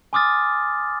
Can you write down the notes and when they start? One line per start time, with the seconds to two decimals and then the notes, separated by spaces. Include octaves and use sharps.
0.13 G#5 C6 D6 D#6 F6 A6